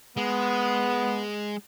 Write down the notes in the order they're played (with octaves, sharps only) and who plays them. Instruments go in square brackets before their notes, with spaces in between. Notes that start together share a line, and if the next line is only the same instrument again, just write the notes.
[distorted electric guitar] G#3 [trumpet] B3